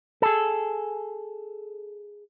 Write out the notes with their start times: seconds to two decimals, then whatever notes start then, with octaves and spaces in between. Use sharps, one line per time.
0.22 G#4 A4